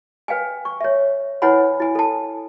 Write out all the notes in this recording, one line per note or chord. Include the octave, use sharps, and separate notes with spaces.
B4 F5 G5 G#5
C#6
C#5 E5
E4 B4 C#5 F#5 G#5 B5
E4 G#5
A4 A5